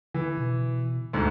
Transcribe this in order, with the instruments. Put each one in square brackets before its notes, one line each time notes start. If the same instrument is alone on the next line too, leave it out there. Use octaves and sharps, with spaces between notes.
[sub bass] D3 [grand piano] E3
[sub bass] B2
[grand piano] D2 G#2